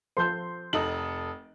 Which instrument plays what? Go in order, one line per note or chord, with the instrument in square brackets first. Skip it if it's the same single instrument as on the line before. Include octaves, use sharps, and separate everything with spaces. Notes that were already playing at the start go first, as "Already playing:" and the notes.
[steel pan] F3 A4 C5 [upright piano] C6 G6
[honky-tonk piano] F1 A4 D#6 [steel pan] D#4 [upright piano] F#7